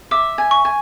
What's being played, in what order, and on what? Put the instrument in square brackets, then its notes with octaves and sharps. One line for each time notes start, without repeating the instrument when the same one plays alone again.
[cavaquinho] E5 [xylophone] D6
[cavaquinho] G#5
[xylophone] C#6
[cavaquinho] G#5